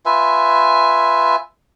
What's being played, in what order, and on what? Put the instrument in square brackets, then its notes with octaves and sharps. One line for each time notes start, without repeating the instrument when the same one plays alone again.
[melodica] F4 B4 E5 G#5